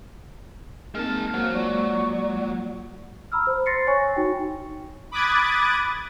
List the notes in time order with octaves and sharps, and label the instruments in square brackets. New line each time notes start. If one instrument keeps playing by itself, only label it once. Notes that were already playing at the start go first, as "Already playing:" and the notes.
[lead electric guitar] G#3 A5 [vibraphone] A#3 C4 A#4 [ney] D#4 [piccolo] F6
[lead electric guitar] F#3 [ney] A#3 [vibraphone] C5
[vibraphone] G#3 A#3 F4 [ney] D5 [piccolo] C#6
[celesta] A#5 B5 E6 F6
C5
C6 A6 A#6 C7 C#7
C#5 G#5 C#6
D#4 F#4 G5
[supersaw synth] B5 D6 D#6 F#6 G#6 A6